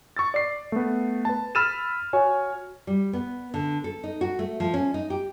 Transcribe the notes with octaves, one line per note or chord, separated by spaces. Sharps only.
C#6 E6 A6
D5 C7
A3 B3
B4 A5
B5 E6 F6 A6 D#7 E7
F#4 C#5 G#5
G3
B3
D3
A4
D#4
F#4
A3
F3
C#4
D#4
G4